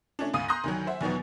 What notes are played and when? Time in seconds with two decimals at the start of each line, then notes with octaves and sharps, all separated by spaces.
0.19 A3 C#4 D4
0.34 D2 G#2 F5 D#6 D#7
0.48 A#5 C6 D#6 F#6 G6 A#6
0.64 D2 D#3 F#3
0.87 C5 E5 F#5
1.01 E2 B2 D#3 F#3 B3